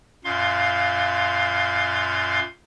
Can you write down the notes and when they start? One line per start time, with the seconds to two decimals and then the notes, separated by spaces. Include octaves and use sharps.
0.24 F#2 A#2 F5 C6